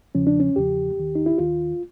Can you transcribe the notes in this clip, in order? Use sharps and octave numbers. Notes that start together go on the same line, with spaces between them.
E2 C#3 F3 C#4
D4
C#4
E2 C#3 F3 G4
D#2 D#3
D#4
E4
D#2 D#3 F4